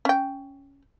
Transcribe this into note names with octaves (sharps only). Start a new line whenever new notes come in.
C#4 G5